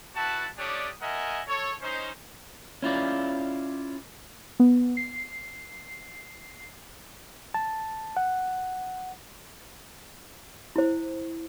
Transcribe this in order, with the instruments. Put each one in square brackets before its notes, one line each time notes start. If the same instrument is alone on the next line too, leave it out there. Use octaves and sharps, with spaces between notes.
[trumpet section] E4 F#4 B4 F#5 A5
A3 D4 G4 C#5 D5 D#6
F4 A#4 D#5 E5 F#5 G#5
A4 C#5
C#4 D#4 C5
[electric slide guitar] C#4 E4 F4 D5
[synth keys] B3
C7
[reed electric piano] A5
F#5
[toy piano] E4 C5